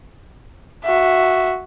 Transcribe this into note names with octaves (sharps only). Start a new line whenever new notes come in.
F#4 E5